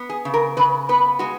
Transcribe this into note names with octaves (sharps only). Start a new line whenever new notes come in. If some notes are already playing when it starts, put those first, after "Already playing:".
Already playing: B3
G#4
C#3
A#4
C#3 B4
B3 B4
G#3 F#4